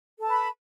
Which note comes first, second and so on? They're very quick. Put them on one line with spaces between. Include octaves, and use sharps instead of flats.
A4 A5 B4 B5